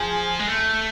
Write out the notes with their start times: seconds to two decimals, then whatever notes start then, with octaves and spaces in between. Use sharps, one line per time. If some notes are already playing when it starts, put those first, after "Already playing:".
Already playing: F3 G#4
0.39 G#3
0.48 A3